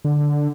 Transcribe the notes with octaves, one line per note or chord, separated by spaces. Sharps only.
D3